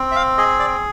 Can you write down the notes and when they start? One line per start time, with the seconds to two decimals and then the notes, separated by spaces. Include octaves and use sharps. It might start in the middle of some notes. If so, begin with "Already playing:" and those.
Already playing: C4
0.11 E5
0.16 F5
0.38 G#4 D#5
0.59 D5